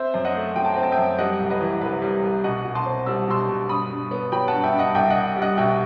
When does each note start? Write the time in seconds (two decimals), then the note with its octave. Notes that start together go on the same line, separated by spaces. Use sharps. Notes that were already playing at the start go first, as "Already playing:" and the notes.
Already playing: C4 C5 E5
0.14 F#2
0.25 D#5 F#5
0.35 A3
0.56 F#3 G5
0.65 A5
0.74 C4 G5
0.83 A5
0.92 E5 G5
0.98 F#2
1.18 G3 D#5 F#5
1.40 C2
1.50 B4 D#5
1.61 E3
1.81 C3 B4
2.02 G3
2.23 C2
2.44 B2 D#5 F#5
2.65 B2
2.75 A5 C6
2.86 C4
3.06 G3 E6
3.28 B2 C6 E6
3.49 B2
3.69 G2 B5 D#6
3.90 G2
4.11 B3
4.32 F#3 G5 B5
4.48 F#5 A5
4.53 G2
4.63 E5 G5
4.73 G2
4.79 D#5 F#5
4.95 C2 E5 G5
5.10 D#5 F#5
5.16 C2
5.36 G3
5.42 D#5 F#5
5.57 B2 E5 G5